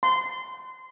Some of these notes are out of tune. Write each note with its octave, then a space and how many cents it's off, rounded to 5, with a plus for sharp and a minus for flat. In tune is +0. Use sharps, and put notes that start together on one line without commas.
C6 -25